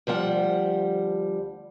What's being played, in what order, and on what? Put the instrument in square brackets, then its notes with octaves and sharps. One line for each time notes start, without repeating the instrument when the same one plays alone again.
[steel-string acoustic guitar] D2 F3 G3 F#5